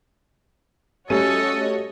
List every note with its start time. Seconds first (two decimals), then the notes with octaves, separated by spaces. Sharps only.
1.10 G3 A3 C#4 F#4 A4 C#5 D#5 D#7